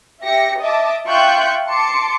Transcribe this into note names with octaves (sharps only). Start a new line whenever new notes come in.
G4 E5 A#6 C#7
D#5 E5 A5 D6
F4 E5 G5 C#6 F#6 G6
A5 C6 D6 C#7